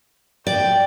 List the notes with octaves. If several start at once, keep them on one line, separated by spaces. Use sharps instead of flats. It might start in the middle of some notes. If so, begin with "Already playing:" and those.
D5 G5